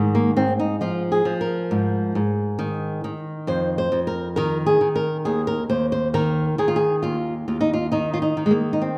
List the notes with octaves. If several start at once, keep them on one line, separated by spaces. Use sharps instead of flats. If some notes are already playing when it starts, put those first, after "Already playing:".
Already playing: G#2 D#3
A#3
G#2 C4
D#4
F3 F4
G#4
F3
A#4
G#2
G#2
D#3
D#3
F2 C5
C5
F2
A#4
D#3 A#4
G#4
D#3
A#4
D#2 G#4
A#4
D#2 C5
C5
D#3 A#4
D#3 G#4
F4
G#4
D#2 F4
D#2 F4
D#4
F4
D#3 D#4
F4
D#4
D#3
G#3
A#3
D#4
C4